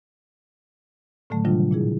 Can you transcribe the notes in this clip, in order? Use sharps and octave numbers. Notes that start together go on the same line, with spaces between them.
A2 D3 D#3 F#3 A3
C3 D#3 F#3 G3 D4 F4
A#2 E4 G#4